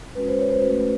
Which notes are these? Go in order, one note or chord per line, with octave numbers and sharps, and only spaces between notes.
G#3 C#4 F#4 B4
C5
C#5
C5
A3 C#4 F#4 B4